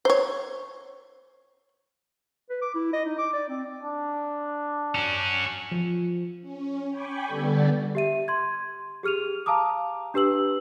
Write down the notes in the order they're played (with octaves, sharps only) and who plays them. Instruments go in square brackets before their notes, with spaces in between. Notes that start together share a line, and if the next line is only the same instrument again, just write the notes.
[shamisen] C5 C#5
[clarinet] B4
D6
E4
D#5
D#4
D6
D5
C4
[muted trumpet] D4
[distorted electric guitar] C#4 F#4
[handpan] F3
[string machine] C#4
G5 G#5 B5 C#6 D6
D3 G3 B3 A4 D5
[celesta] G4 E5 D#7
C6 G#6
G4 G#4 F6 D#7 F7
F5 A5 A#5 D6 D#6
D4 G4 B4 E6 F#7